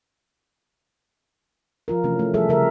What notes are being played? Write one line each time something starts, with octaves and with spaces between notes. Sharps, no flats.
F3 F4 A#4
C3 E3 A3 C#4
A3
F3 G3 G#4 A4 E5
C#3 G#4 A#4 E5